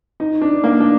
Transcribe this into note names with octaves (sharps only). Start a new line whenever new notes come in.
D#4
D4
A#3
D4